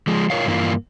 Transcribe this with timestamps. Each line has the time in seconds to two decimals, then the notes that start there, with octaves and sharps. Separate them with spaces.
0.07 F3 G#3
0.30 F4 A#4 C#5 F5
0.46 G2 E3 A#3 F4